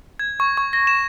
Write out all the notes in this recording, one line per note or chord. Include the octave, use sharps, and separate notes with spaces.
G#6
C#6
C#6
A#6
E7